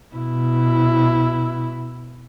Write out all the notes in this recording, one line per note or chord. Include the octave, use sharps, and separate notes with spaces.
B2 E4